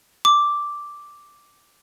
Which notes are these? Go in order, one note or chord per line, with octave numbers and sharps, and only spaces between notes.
D6